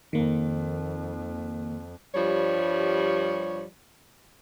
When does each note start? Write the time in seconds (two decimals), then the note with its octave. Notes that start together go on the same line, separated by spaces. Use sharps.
0.13 F2 D#3 A#3
2.15 G2 F3 G3 C#5